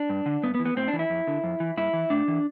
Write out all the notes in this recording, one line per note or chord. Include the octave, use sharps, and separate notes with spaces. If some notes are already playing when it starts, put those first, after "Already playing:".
Already playing: D4
G2
D3
G2 B3
B3
E3
B3
A2 C4
D4
E3
E4
F2
D3
F2
E3
G2 E4
E3
A2 D4
E3